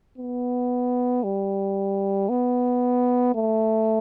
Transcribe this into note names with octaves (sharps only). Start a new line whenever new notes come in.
B3
G3
B3
A3